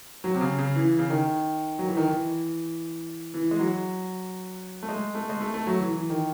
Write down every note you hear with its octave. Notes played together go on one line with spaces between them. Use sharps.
F#3
C3
C#3
C#3
E3
C#3
D#3
F#3
E3
D#3
E3
E3
G#3
F#3
A3
G#3
A3
G#3
A3
A3
F#3
E3
E3
D#3